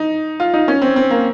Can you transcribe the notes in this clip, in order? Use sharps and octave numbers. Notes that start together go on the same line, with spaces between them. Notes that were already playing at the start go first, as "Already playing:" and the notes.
Already playing: D#4
F4
D#4
C#4
C4
C4
A#3